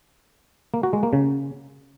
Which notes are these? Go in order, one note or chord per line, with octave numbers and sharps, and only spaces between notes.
A#3
F#4
G#3
A#3
C#3